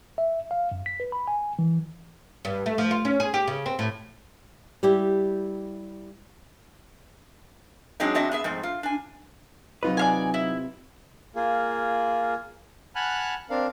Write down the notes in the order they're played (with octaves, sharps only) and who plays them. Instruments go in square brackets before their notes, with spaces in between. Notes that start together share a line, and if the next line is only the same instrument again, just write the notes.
[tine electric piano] E5
F5
F#2
B6
B4
B5
G#5
E3
[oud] G2
A3
F3
F4
C#4
G#4
G4
C#3
C4
A2
[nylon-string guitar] G3 E4 G4
[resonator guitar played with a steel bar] F#3 G#3 C4 D4 D#4
E2 C4 D4 F#4 D#5 E5
B3 G#4 E5
G#2 F3 A3 C4
F4
D4 G#5
[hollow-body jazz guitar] C3 F4 B4 [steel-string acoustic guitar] F#3 D#4 D#5
[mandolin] D5 F5 G#5
E4
[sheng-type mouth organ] A#3 F4 G#4
F#5 G#5 A5 B5 F6 F#6
C4 D4 A#4 F5